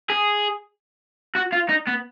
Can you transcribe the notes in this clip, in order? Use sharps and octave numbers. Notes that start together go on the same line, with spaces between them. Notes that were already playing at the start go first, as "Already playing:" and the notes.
G#4
F#4
F4
D#4
B3